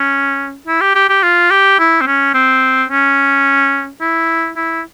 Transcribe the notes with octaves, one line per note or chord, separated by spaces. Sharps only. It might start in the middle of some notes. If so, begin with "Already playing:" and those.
Already playing: C#4
E4
G4
G4
G4
F4
G4
E4
C4
C#4
C4
C#4
E4
E4